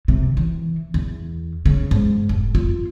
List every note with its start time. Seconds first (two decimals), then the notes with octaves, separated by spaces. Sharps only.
0.08 C3
0.37 E3
0.94 E2
1.66 C#3
1.91 G#2
2.29 F1
2.55 F4